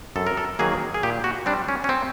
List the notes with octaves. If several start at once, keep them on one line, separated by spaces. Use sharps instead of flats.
F#2 A4
A#4
A4
D#3 F#3 A#3 G#4
G#4
A#2 G4
F#4
G3 C4 D4
C#4
C#4
C4